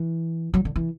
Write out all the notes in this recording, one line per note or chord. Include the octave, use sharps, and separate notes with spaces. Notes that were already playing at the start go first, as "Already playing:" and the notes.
Already playing: E3
F#3
D3
E3